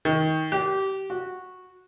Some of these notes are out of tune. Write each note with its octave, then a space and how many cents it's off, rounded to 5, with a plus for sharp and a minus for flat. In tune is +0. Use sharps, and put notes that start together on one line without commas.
D#3 +20
G4 -25
F#4 -10